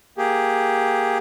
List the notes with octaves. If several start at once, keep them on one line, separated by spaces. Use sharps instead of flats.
A#3 G4 G#4